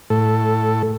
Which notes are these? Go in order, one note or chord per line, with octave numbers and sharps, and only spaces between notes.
A2 A4